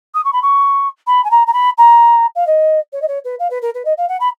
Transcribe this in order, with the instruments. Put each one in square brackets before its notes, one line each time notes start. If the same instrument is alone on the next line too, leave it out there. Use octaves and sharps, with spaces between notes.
[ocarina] D#6
C#6
B5
C#6
B5
G#5
A#5
A#5
B5
A#5
F5
D#5
C#5
D#5
C#5
B4
F5
B4
A#4
B4
D#5
F5
F#5
B5